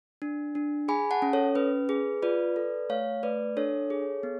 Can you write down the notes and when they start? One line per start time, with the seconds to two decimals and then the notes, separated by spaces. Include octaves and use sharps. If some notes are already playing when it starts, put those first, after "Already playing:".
0.22 D4
0.55 D4
0.88 G#4 G#5 B5
1.11 F#5 A5
1.22 C#4
1.33 A4 C#5
1.55 C#4 B4
1.89 G#4
2.22 F4 B4 D5
2.56 A4
2.89 A3 C#5 F5
3.23 A3 B4 D5
3.57 D4 A4 C#5
3.90 G#4
4.23 B3